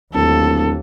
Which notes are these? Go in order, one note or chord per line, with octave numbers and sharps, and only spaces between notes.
D1 D#2 A4